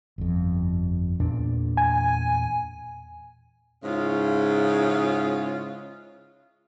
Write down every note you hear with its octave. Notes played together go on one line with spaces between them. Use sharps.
G1 F2
E2 A#2 D4
G#5
G#2 C#3 E4 F4